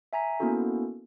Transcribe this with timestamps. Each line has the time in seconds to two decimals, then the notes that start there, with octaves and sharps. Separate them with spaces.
0.13 E5 G#5 A#5 B6
0.40 A#3 B3 C#4 E4 F#4 A4